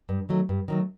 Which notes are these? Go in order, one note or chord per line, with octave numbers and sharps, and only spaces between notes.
G2
D#3 F#3 A3
G2
D#3 F#3 A3